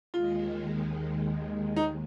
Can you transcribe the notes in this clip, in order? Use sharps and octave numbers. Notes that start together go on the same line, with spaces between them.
D#2 D#3 G#3 F4
D#2 D#4